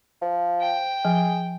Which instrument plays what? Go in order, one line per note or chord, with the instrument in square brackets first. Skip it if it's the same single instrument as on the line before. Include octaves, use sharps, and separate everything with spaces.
[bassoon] F3
[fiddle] G5
[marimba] F3 [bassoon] G#4